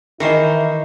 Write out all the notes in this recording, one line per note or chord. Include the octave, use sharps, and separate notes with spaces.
D#3 E3 E4 A#4 C5 D#5